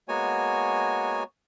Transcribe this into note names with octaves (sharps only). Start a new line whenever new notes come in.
G#3 A#3 B3 F#4 C#5 G#5